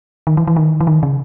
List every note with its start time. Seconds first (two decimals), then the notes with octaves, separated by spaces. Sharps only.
0.27 D#3
0.37 E3
0.47 E3
0.56 D#3
0.80 E3
0.87 D#3
1.03 C#3